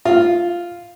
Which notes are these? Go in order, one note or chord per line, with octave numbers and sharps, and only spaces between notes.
F4